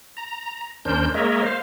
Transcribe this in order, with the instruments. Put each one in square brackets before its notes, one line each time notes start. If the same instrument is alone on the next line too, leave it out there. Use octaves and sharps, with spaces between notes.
[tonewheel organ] A#5
D#2 C#4 D4 A#4 C5 G6
G#3 A#3 A#4 C#5 D#5 E5
C5 F5